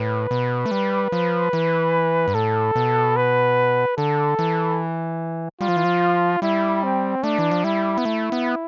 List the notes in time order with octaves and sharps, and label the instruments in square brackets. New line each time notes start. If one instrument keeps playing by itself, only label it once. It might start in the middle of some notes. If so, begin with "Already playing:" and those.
Already playing: [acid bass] A2 [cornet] B4
[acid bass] B2
A3
G3
F3
E3
G2
[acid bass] A2 [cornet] A4
[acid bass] B2
[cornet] B4
[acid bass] D3 [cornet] A4
[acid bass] E3
[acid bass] G3 [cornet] F4
[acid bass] F3
E3
F3
[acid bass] G3 [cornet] E4
[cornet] C4
[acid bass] A3 [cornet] D4
[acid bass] E3
F3
[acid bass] G3 [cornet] E4
[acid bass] B3
A3
B3